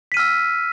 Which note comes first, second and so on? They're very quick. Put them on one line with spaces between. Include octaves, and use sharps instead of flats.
B6 D#7 F6 E6